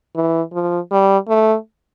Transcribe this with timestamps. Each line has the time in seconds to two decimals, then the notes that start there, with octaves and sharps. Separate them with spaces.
0.16 E3
0.53 F3
0.91 G3
1.29 A3